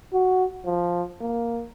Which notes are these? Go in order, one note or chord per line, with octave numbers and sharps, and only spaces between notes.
F#4
F3
A#3